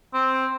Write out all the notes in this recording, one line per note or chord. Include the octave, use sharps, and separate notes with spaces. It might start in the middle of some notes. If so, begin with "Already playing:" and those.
C4